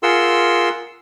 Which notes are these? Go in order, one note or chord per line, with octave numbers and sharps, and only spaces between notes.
F4 G#4 A#4 F#5 C6 E6